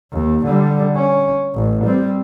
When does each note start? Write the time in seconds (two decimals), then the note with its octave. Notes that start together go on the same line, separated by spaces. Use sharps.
0.13 D#2
0.46 D3 G3
0.96 C#4
1.55 A1
1.85 G3 C4